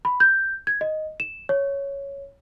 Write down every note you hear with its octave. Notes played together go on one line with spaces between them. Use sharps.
B5
G6
G#6
D#5
E7
C#5